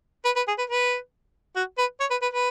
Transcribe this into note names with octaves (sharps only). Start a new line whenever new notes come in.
B4
B4
G#4
B4
B4
F#4
B4
C#5
B4
B4
B4